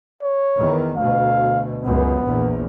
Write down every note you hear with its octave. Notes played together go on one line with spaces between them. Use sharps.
C#5
E2 D#3
D2 B2 F5
C#2 F#2 B3
A#1 E2